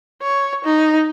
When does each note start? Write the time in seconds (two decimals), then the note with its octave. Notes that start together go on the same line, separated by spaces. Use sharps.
0.22 C#5
0.64 D#4